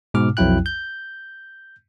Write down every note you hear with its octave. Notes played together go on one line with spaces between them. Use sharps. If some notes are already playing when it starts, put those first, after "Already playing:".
G#2 B2 D6 F6
B1 F2 F#3 E4 G5 F#6
G6